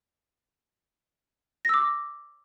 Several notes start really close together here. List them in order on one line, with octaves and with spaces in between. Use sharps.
A#6 E6 D6